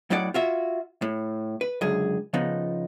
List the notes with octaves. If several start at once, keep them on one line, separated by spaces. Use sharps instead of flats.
F#2 A2 F#3 D#4 D5 F#5
F4 F#4 E5
A2
B4
C#2 F#2 D3 G#4
C#3 F3 B3 D#4